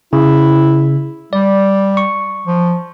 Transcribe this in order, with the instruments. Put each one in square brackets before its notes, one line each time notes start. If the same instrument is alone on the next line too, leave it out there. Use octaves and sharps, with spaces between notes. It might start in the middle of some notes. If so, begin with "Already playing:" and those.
[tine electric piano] C#3 [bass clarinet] E4
[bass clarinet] G3 [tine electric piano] D5
[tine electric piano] C#6
[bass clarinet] F3